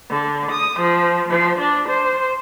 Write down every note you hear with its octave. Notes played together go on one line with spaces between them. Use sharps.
D3
D#6
F3
F3
D4
C5